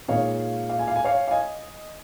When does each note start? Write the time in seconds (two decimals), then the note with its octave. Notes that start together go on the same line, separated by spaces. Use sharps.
0.08 A#2 G#3 D#4 C#5 F5
0.69 F5
0.79 G#5
0.87 F5
0.96 G#5
1.04 C#5 F5
1.28 F5
1.31 D#5 G#5